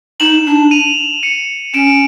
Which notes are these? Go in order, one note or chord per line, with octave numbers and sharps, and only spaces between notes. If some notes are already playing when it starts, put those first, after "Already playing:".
D#4 E7 F#7
D4
D#7 F7
C#7 D#7
C#4 D7 E7